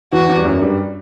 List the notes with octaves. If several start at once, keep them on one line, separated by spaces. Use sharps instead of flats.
E2 E3 F#4
E2 E3
G3
F#2 F#3
G2 G3